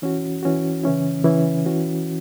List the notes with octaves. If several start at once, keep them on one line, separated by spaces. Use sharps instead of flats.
E3 C#4 F#4
E3 C#4 F#4
C#3 E3 C#4 E4
C#3 E3 C#4 E4
E3 C#4 F#4